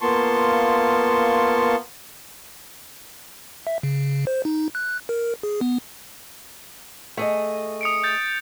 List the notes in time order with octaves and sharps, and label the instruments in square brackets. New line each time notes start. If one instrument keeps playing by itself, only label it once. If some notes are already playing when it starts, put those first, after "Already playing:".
[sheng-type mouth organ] A#3 B3 F4 A5 C6 C#6
[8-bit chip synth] E5
C#3
C5
D#4
F#6
A#4
G#4
B3
[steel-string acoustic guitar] A3 G#4 D#5
[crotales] D#6 C#7 D7
G6 A6